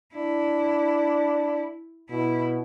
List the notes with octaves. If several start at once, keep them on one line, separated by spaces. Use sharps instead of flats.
D4 E4
B2 E4